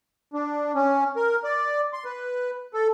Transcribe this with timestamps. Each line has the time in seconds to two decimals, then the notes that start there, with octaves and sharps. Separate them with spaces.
0.33 D4
0.75 C#4
1.16 A#4
1.44 D5
1.93 C6
2.05 B4
2.74 A4